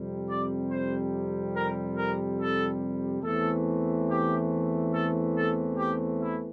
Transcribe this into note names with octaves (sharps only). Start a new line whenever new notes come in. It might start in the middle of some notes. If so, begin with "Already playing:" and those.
Already playing: F2 C3 G3
D5
C5
A#4
A#4
A4
E2 E3 A3 C4 A4
G4
A4
A4
G4
E4